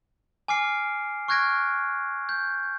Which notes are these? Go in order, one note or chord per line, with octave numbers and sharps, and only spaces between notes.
G#5 D6 F6 C7 D7
C#6 F6 F#6 G#6 A#6 D7
G6